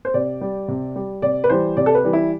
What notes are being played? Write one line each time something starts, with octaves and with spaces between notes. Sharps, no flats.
C5
C3 D5
G3
C3
G3
C3 D5
B4
E3 G3 C5
C3 D5
A4
B4
E3 G3
E4